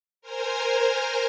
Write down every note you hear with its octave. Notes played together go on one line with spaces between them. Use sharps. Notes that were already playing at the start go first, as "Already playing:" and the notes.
A#4 C5 G#5 A#5